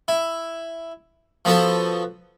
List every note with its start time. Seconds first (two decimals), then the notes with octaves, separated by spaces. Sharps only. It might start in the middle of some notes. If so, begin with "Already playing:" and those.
0.08 E4
1.45 F3 B3 F#4 A4 B4